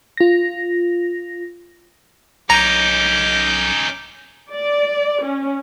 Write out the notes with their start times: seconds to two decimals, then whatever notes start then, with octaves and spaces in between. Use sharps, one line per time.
0.17 F4 A#6
2.50 B1 C#4 D#4 A#5 D6 G6
4.50 D5
5.21 C#4